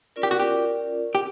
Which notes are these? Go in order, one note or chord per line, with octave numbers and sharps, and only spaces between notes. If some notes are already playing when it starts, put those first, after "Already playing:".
C#4 F4 A#4 D5
G4
F#4
G4
G4